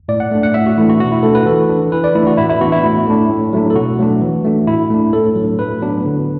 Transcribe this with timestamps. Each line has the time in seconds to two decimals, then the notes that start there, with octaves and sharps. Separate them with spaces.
0.09 A2 D5
0.20 F#5
0.31 A3 D4
0.43 F#5
0.54 A2 E5
0.66 F#4
0.78 E3 A3 D4 E4
0.89 F#4
1.00 B2 F#4
1.12 E4
1.23 A3 D4 A4
1.35 B4
1.46 E3 A4
1.69 D4
1.92 E3 B4
2.04 D5
2.15 A3 D4 E4
2.27 F#4
2.37 A2 E4
2.49 E4
2.61 E3 B3 D4 F#4
2.72 E4
2.83 A2
3.07 A3 D4
3.29 A2
3.53 F#3 A3 D4
3.70 A4
3.75 B2 F#4
3.99 F#3 A3 D4
4.22 E3
4.45 A3 D4
4.67 A2 E4
4.90 A3 D4
5.13 A2 A4
5.36 F#3 D4
5.59 A2 B4
5.82 F#3 B3 D4
6.05 D3